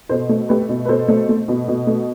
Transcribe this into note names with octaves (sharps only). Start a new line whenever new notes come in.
B2 A4 C5
A3
A3 G4 B4
B2
B4
B2 A4 C5
A3
A3
B2
B2
A3